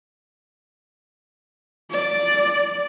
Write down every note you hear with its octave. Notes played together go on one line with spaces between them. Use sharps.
D5